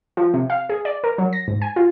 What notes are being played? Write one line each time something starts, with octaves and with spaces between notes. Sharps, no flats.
F3
C3
F5
G#4
D5
A#4
F#3
A#6
G#2
G#5
F4